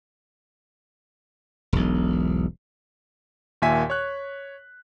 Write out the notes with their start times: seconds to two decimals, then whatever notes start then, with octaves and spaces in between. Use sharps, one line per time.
1.73 E1 B1
3.62 D#2 A#2 E5 G#5 B6
3.90 C#5 F#6